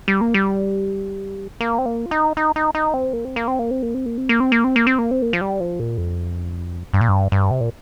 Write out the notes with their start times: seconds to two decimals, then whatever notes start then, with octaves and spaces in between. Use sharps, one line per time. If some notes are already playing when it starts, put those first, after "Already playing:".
0.08 G3
0.21 A#3
0.34 G3
1.61 A#3
1.78 C4
1.86 A#3
2.06 F4
2.11 D#4
2.37 D#4
2.56 D#4
2.75 D#4
2.94 C4
3.13 A#3
3.25 C4
3.36 A#3
3.48 C4
3.59 A#3
3.71 C4
3.83 A#3
3.94 C4
4.06 A#3
4.18 C4
4.29 A#3
4.40 C4
4.52 A#3
4.64 C4
4.76 A#3
4.87 C4
4.98 A#3
5.11 C4
5.22 A#3
5.33 F3
5.41 G3
5.60 F3
5.80 A#2
5.98 F2
6.94 G2
7.01 A#2
7.09 G2
7.32 G2
7.51 C3
7.61 A#2